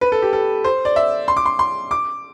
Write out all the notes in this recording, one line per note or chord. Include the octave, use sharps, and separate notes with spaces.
B4
A4
G4
A4
C5
D5
E5
C6
D6
C6
C6
D6